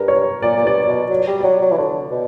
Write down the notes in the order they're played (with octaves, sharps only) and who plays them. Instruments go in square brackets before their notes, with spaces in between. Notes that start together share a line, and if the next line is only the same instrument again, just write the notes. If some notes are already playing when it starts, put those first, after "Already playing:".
Already playing: [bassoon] G2 [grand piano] A#4
[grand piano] C#5
[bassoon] A#2 [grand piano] D5
[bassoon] A#2
[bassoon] G2 [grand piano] D5
[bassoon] B2 [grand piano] D5
[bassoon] F#3
[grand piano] D5
[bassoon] G3
[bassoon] F#3 [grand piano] D5
[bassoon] F#3
E3
[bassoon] D3 [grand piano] C#5
[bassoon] B2